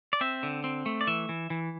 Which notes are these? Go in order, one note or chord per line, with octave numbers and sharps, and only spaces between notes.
D5
C4 E5
D3
C4
A3
D5
E3 E5
E3
E3